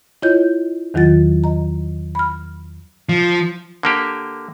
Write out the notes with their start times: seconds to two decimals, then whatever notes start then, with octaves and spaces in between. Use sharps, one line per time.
0.22 E4 F4 C#5 D#5 G6
0.94 E2 D#3 F#3 F4 A6
1.44 D#5 A#5
2.15 B5 F6
3.09 F3
3.83 D3 A#3 G4